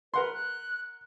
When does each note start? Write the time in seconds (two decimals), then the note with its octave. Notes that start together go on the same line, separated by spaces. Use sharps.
0.14 A#4 B4 F#5 C6
0.33 F#6